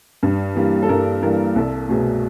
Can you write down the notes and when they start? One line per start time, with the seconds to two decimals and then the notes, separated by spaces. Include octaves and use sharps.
0.23 G2
0.55 E3 G3 A#3
0.83 A4
0.89 G2 A#4
1.22 E3 G3 A#3 A#4
1.56 C2 A4
1.89 B2 F#3 A3 G#4